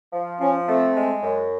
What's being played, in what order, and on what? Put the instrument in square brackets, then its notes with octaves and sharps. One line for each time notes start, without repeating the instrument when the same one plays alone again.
[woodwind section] F3
[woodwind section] F3 [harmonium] C#4
[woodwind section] A3 [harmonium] C4
[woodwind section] G#3
F#2